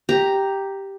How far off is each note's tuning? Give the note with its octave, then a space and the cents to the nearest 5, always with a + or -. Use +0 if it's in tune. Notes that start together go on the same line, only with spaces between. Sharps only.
G4 +0 A#5 +0